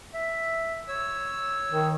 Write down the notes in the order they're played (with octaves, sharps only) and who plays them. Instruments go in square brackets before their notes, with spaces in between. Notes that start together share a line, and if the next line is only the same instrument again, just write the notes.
[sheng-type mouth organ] E5
C#5 E6
[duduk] D#3